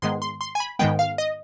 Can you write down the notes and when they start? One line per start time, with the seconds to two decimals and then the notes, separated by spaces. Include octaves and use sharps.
0.02 G#2 D#3 G#3 B3 C6
0.22 C6
0.41 C6
0.55 G#5
0.60 B5
0.79 G#2 D#3 G#3 B3 G5
0.99 F5
1.18 D#5